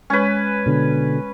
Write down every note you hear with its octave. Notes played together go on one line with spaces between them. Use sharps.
G#3 C#4 B4
B2 D3